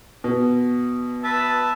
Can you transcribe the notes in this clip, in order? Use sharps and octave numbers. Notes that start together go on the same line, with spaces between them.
B2
B4 E5 A5